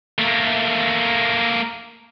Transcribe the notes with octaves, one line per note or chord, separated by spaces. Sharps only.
A3 A#3